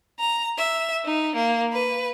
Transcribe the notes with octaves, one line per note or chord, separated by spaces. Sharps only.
A#5
E5
D#4
A#3
B4